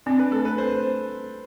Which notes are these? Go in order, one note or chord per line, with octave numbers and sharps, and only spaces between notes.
C4 D4
B4
A3 A4
B4
C4 C5